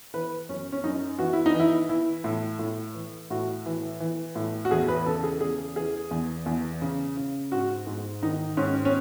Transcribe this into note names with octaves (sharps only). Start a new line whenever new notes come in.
E3 B4
F#2 C#4
C#4
F#2 D#4
E3 F#4
E4
D#4
E3
E4
E3 E4
A2
A2
E3
A2 F#4
E3
E3
A2
F#4
E2 G#4
B4
C#3 A4
G#4
E2 G#4
E3 G#4
E2
E2
C#3
C#3
G#2 F#4
G#2
D#3 D#4
G#2 C#4
C#4